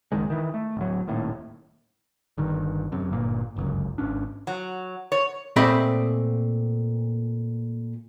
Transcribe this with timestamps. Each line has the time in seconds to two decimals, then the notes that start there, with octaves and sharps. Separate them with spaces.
0.12 F#1 C2 D#3 G#3
0.30 D#3 E3
0.54 A3
0.77 D1 F#3
1.07 D#1 D#2 A2
2.38 G1 G2 D#3
2.92 F#2 C3
3.11 G1 G2 A#2 A#3
3.56 G1 C#2 F#2
3.98 G#1 C#4 D4
4.47 F#3
5.12 C#5
5.56 A#2 A3 C4 D#5 B5